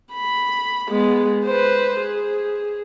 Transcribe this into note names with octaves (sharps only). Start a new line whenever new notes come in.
B5
G#3 B3
B4 C5
G#4